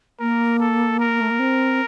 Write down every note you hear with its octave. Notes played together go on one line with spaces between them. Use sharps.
A#3 A#4
A4
A#4
A3
A#3
C4